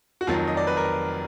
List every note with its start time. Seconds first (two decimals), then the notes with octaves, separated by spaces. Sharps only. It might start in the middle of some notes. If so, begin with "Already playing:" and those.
0.21 F#4
0.27 F1 F2 D#3 F#3 F4
0.47 D#5
0.57 D5
0.67 B4
0.77 A#4